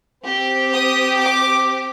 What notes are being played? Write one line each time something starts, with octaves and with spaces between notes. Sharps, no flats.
C4 G4
D#6
D6